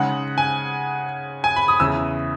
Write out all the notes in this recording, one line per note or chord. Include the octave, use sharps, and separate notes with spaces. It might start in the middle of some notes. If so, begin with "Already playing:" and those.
Already playing: C#3 G#3 D#4 F#5
G#5
G#5
B5
D#6
E2 C#3 E3 E6